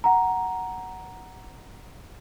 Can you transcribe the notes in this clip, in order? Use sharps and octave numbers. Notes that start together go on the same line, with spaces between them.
F#5 A#5